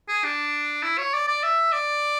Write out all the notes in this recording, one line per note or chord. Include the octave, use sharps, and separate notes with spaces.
G#4
D4
E4
C#5
D5
D5
E5
D5